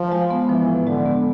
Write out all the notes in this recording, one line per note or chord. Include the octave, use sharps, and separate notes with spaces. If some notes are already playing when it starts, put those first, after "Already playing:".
Already playing: F3
G#3
B3
E3 F3
A2
D3 G#3
B3